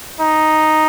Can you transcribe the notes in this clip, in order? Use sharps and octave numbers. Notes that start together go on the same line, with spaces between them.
D#4